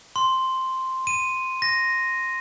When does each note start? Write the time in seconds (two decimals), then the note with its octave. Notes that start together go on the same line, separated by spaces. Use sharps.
0.16 C6
1.07 D#7
1.62 A#6